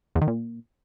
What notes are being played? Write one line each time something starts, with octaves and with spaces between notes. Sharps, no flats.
E2
D#3
A#2